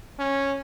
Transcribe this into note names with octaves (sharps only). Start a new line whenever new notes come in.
C#4